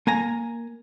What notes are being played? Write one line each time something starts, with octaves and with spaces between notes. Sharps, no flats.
A#3 G#5 A#5